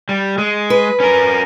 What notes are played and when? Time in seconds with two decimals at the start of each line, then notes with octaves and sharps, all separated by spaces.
0.09 G3
0.38 G#3
0.70 B4
1.00 C#4 A#4